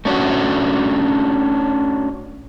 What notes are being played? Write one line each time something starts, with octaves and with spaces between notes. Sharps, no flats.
A3 C#4 D4 F#4